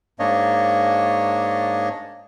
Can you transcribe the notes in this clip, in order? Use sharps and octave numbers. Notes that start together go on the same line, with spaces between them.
G#2 A#3 D4 C#5 D#5